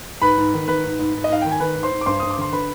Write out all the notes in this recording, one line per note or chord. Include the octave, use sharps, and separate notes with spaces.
G#2 B4 B5
G#2
D#3
D#3 B4 B5
G#2
G#2
G#2
D#5
G#2 F5
D#3 G5
G#5
D#3 B4 B5
G#2
C5 C6
G#2
D6
G2 C5 C6
G2 D#6
D6
D3 C6
D3 B4 B5